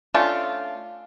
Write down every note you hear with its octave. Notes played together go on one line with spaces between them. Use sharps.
A3 C#4 D4 F4